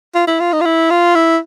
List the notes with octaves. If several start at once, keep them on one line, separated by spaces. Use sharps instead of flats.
F4
E4
F4
D#4
F4
E4
F4
E4